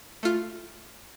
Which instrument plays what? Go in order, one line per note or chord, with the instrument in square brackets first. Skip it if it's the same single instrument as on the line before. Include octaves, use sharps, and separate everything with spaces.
[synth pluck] A3 F4